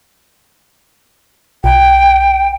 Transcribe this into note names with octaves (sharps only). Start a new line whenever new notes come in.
B1 G5